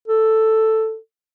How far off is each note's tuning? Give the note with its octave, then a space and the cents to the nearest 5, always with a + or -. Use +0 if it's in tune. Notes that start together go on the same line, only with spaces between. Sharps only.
A4 +5